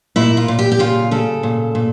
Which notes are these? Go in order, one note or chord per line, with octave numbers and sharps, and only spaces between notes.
A#2 E4
F4
A#2
G4
G4
C#3 F4
C#3 A4
A#2
A#2